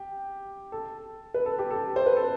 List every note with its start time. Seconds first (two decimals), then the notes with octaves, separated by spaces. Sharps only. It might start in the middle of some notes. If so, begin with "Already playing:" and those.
Already playing: G4
0.72 A4
1.34 B4
1.46 A4
1.59 G4
1.71 A4
1.96 C5
2.06 B4
2.16 A4